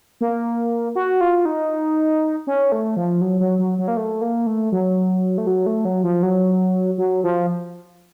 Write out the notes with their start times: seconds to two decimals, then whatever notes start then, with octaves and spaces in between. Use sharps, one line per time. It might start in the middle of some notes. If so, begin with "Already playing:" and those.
0.21 A#3
0.95 F#4
1.21 F4
1.45 D#4
2.47 C#4
2.72 A3
2.97 F3
3.21 F#3
3.40 F#3
3.59 F#3
3.79 F#3
3.88 A#3
3.97 A3
4.22 A#3
4.47 A3
4.72 F#3
5.38 A3
5.47 F#3
5.66 A3
5.85 F#3
6.03 F3
6.23 F#3
6.98 F#3
7.24 F3